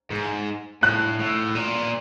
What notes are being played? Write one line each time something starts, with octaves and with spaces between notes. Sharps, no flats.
G#2
A2 F#6
A2
A#2